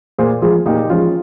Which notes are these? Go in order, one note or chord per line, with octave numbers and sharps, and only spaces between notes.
A#2 G#4 C5
F3 G#3 F4 G#4
A#2 D#4 G4
F3 G#3 C#4 F4